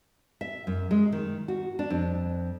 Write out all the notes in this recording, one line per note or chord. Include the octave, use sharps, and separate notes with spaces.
E5
F#2
G#3
D#3
F#4
D4
F2